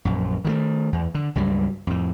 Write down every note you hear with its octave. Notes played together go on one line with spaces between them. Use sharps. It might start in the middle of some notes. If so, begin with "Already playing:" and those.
A#1 F#2
D#3 F3 A3
E2
D3
C#2 G2 F#3 G3
F2 A2